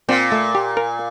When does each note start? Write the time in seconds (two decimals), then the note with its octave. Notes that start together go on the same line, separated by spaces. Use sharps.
0.09 A#2 C4
0.32 A3
0.55 G4
0.77 A#4